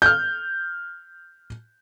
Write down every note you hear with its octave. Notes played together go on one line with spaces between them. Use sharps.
F6 G6